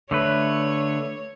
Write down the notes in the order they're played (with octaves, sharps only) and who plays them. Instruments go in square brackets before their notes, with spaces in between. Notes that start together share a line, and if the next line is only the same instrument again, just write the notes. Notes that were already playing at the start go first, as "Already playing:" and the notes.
[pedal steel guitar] D3 A3 B4 [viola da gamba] C#5